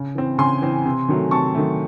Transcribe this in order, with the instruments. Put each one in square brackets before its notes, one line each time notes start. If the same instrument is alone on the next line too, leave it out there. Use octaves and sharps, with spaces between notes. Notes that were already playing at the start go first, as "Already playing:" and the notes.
Already playing: [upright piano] C#3
E3 C4
C#3 G#5 C6
E3 C4
C3
D#3 F#3 A3
C3 A5 C#6
D#3 F#3 A3